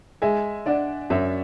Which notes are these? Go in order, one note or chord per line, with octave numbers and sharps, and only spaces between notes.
G#3 E5 G#5
D4 D5 F#5
F#2 C#5 E5